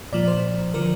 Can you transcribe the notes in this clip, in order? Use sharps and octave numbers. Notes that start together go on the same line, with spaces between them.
A#2 F3 D5
C5
D3 F3 A#4